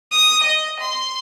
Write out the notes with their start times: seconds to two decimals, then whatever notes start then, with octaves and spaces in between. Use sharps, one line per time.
0.12 D#6
0.43 D#5
0.80 C6